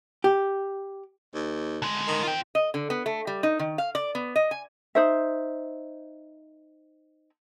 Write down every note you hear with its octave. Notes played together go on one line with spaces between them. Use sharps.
G4
D#2
D3 G#3
D#3
F4 G5
D#5
D3
B3
A3
G3
D#4
D#3
F5
D5
B3
D#5
G#5
D#4 C5 E5